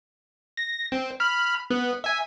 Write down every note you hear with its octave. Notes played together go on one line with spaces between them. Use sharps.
A#6
C4
B5 F6
B3
E5 G#5